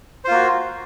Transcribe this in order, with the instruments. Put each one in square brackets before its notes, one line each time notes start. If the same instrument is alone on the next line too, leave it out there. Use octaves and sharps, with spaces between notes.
[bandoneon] C5
F4
A#3
F#4